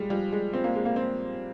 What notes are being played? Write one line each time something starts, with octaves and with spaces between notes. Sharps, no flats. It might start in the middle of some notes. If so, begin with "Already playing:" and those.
Already playing: A#2 G3 G#3
F3 G3
G#3
A#2 C4
A#3
G#3
A#3
F3 C4